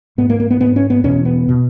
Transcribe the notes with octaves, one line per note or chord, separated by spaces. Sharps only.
G#2 B3
A#3
A#3
B3
G#2 B3
C#4
B3
E2 B2 C#4
B3
B2